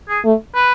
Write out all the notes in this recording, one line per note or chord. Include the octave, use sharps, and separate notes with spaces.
G#4
A3
B4